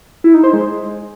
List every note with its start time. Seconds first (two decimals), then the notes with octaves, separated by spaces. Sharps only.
0.24 E4
0.34 D#4
0.44 C5
0.53 G#3